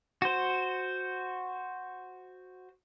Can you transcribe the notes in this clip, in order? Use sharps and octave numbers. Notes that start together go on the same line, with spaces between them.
F#4 C5